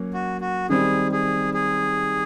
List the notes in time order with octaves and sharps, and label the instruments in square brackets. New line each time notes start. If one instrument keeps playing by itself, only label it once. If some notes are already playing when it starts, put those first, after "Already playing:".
Already playing: [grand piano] F#3 A#3 C#4
[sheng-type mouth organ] F#4
F#4
[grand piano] D#3 G3 C4 [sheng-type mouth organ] G#4
[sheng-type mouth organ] G#4
G#4